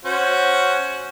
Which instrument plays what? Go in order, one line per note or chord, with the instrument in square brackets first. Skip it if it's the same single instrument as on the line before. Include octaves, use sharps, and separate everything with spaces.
[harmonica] C#4 F#4 C5